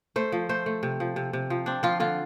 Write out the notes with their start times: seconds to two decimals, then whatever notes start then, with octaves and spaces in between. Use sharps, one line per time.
0.16 A3 C5
0.32 F3
0.49 A3 C5
0.66 A3
0.83 C3
1.00 F3
1.16 C3
1.33 C3
1.50 F3
1.66 C4 D4
1.83 F3 F4
2.00 D3 F4